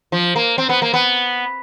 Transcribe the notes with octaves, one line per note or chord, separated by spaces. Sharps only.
F3
A#3
C4
B3
A#3
B3